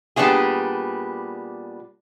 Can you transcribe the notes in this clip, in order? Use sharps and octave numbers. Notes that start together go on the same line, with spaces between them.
A#2 G3 B3 D4 F4 G#4